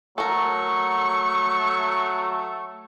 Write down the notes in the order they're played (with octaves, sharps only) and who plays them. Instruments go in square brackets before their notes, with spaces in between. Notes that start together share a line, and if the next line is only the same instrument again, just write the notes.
[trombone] F#3 [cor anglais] A3 [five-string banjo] A4 A#4 [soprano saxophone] C#6